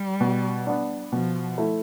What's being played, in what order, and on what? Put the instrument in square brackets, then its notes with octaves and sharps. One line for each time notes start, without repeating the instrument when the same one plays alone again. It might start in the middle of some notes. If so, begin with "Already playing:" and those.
Already playing: [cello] G3
[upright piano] B2
B3 D4
[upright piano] B2 [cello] F3
[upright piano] A3 E4